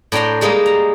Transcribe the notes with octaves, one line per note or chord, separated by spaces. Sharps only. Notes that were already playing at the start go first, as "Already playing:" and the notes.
A2 D4 G5 A#5 C6
G3 G#3 A#3 D#4
A#5